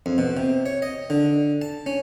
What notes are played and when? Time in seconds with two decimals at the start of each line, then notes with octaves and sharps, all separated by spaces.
0.06 F2
0.18 B2
0.37 C3
0.66 C#5
0.82 D#5
1.10 D3
1.62 A5
1.86 C#4